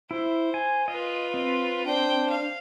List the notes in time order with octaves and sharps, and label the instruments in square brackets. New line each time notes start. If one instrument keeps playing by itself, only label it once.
[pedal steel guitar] E4 [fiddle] C5
[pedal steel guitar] G#5
[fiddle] F4 B4 [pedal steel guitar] D#5
[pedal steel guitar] C4
[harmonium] D4 [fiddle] C5 G5
[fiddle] F5